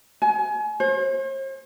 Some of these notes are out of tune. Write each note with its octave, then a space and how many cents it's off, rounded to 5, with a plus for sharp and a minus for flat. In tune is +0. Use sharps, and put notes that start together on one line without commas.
G#5 +30
C5 +45